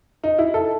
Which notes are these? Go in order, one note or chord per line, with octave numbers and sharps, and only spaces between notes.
D#4
E4
A4